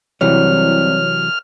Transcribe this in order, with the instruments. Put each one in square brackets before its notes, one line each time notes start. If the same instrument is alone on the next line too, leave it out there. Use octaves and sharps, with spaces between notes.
[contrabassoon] C2 [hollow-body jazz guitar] C3 E3 F#3 [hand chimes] C#5 [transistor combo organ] F6